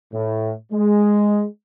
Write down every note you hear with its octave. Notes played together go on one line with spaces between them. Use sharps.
A2
G#3